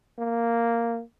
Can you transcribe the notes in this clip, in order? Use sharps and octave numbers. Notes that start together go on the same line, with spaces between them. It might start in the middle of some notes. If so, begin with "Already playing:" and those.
A#3